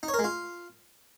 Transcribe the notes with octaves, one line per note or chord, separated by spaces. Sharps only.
D#4
C#5
A#4
G#3
F4